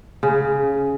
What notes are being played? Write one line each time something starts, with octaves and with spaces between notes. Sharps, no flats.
C#3